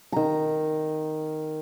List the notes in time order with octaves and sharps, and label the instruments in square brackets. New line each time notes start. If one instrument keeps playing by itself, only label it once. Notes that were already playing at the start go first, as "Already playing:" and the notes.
[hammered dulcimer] D#3 A#5